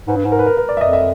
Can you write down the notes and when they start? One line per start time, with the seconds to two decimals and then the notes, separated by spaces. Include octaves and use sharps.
0.07 G#2 B4
0.16 G2
0.25 G#2
0.32 A#4
0.39 B4
0.46 A#4
0.57 A#4
0.69 D5
0.77 E5
0.81 F2 D#5
0.93 E5